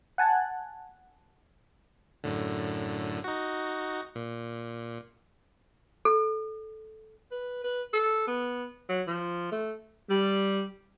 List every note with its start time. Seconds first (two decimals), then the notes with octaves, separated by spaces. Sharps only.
0.18 F#5 G#5 A5
2.24 F#2 A2 D3
3.24 D#4 F#4
4.15 A#2
6.05 A4
7.31 B4
7.64 B4
7.94 A4
8.27 B3
8.89 F#3
9.07 F3
9.52 A3
10.10 G3